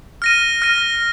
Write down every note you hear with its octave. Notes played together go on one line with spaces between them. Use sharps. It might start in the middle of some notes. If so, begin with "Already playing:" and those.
F6 A#6 D#7
F6 A#6 D#7